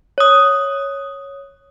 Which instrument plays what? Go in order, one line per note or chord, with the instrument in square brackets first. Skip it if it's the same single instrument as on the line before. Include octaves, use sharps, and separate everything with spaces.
[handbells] C#5 D#6